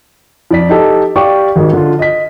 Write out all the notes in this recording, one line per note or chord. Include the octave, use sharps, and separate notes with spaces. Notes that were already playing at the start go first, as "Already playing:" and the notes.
F2 D5 B6
D#4 G4 A4
G4 D5 F5 G5 C#6 D6
G#1 D#3 G#4
D3 F4
D#5 B6